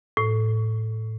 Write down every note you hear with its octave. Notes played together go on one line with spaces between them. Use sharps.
A2